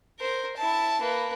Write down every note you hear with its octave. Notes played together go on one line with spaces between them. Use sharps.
A#4 C5
E4 A5
A#3 B4